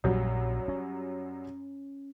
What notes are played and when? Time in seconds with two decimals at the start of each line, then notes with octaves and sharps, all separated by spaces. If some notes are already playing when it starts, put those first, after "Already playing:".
0.04 A#1 F#2 A#2 F#3 G3
0.68 C#4